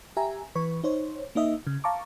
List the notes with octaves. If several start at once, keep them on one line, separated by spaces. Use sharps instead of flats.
G4 E5 G#5 A#5
E3 B4 C#6
D#4 C5 C#5
A#3 D#4 D#5 E5
C#3
F5 A5 A#5 C#6 D6